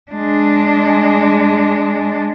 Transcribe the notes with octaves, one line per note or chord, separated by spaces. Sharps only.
G#3 D4